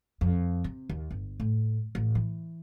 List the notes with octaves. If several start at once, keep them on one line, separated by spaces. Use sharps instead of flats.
F2
C3
D#2
G1
A2
A1
E3